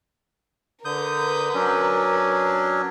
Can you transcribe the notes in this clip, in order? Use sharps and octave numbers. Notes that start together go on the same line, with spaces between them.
D3 A#4 B4 D#6 G6
F#3 C#4 D4